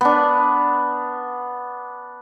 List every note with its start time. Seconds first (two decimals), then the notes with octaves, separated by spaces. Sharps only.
0.01 B3 D4